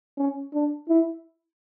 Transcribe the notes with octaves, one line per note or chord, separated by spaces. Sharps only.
C#4
D4
E4